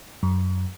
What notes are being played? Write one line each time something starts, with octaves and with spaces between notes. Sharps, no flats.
F#2